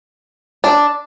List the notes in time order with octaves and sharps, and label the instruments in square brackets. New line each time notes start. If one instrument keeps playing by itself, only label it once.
[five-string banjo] D4